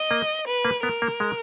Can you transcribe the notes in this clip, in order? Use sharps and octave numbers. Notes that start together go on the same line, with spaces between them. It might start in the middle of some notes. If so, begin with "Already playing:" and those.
Already playing: D#5
A#3
B4
A#3
B3 A#4
A#3
G#3